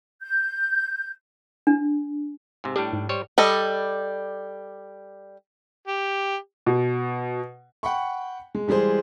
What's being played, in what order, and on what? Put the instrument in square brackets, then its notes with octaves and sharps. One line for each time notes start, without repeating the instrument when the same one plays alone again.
[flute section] G6
[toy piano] D4
[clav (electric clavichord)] G#2 C3
[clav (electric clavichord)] A2 G3 D4 [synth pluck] G4
[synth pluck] G#2
[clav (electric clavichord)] G3 C5 C#5
[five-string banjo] G3 A4 D#5
[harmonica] G4
[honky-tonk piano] B2
[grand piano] F#5 G5 B5 C#6
G#3
E3 G3 G#3 G#4 C5